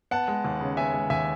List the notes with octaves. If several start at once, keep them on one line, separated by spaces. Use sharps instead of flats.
B3 F#5 A5
G#3
D#2
C#3
B3 E5 G#5
G#3
D#2 E5 G#5